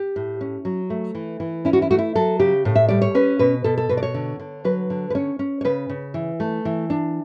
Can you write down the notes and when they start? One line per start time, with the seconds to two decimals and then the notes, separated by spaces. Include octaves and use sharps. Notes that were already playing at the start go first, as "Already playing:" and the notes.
Already playing: G4
0.16 A2
0.41 C#4
0.65 F#3
0.90 A3
1.15 E3
1.40 E3
1.65 C#4 E4
1.73 F#4
1.82 E4
1.91 A3 F#4
1.99 E4
2.15 F#3 A4
2.39 C#3 G4
2.65 A2
2.75 E5
2.89 G3 D5
3.02 C#5
3.15 C#4 B4
3.39 B2 B4
3.64 B2 A4
3.78 A4
3.89 B2 B4
3.97 D5
4.03 C#5
4.14 D3
4.40 D3
4.65 F#3 B4
4.90 D3
5.10 B4
5.15 C#4 C#5
5.39 C#4
5.61 C#5
5.65 C#3 B4
5.89 C#3
6.14 E3
6.40 A3
6.65 E3
6.90 D4